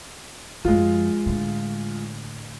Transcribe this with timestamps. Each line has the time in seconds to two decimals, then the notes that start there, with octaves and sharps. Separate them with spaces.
0.65 F#2 F3 G#3 F4
1.26 A2 D3